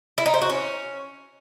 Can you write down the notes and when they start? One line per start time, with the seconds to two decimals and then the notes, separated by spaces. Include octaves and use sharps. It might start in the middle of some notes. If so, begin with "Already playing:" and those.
0.18 E4
0.26 D#4
0.34 C5
0.42 F#4
0.49 C#4